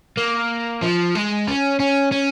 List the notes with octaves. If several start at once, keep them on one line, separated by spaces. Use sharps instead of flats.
A#3
F3
G#3
C#4
C#4
C#4